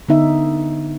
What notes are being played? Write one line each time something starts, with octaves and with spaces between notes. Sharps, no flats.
D3 B3 D#4 E5